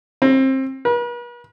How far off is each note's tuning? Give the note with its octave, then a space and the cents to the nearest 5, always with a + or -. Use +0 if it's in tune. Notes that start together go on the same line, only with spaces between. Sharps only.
C4 +25
B4 -45